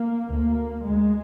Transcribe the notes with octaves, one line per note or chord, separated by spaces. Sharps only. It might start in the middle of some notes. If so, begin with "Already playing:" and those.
Already playing: A#3
D2 A#3
D2 G#3